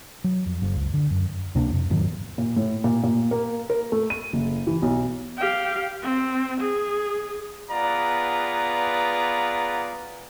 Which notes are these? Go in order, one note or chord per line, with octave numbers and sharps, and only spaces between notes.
F#3
F2
F#1
C#2
D3
F#2
C#2 C3 A#3 D4
F2
F2 G#2 D#3 F#3
A#2
A2
A#2
A#2
A#3
A#4
A3
D#7
F#1
E3
B1
G4 F5
C4
G#4
B3 F4 G#4 B4 D5 A#5